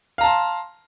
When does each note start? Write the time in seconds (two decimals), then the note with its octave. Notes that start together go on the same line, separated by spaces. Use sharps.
0.18 F5
0.21 A#5
0.23 A5
0.26 C6